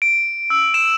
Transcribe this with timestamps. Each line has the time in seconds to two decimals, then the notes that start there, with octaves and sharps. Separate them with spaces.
0.02 D7
0.50 E6
0.74 E7